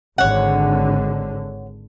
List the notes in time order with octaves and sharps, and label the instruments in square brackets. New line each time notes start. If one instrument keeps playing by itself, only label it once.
[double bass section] G#1 D3 [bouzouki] C#5 F#5